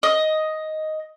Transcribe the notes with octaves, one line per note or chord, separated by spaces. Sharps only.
D#5